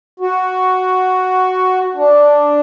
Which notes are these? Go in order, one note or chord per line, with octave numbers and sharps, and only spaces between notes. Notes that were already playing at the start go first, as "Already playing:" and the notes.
F#4
D4